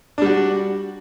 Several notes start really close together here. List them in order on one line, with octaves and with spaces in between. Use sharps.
D4 G3 F#4